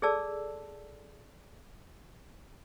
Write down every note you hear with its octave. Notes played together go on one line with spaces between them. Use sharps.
G#4 A4 D5 A5 E6